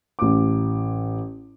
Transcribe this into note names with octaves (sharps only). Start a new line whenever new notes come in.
A1 D6